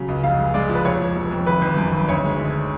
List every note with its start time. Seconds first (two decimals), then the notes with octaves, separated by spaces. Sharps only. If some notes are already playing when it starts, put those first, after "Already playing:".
Already playing: C#3 F#3
0.08 C#2
0.23 F1 F5
0.39 G#3
0.54 G#3 D5
0.69 F3
0.75 B4
0.85 F1 C#5
1.00 F1
1.16 F1
1.31 F2
1.46 G#1 B4
1.61 G#1
1.77 F#2
1.92 G#1
2.08 D2 C#5
2.24 G#3
2.40 D3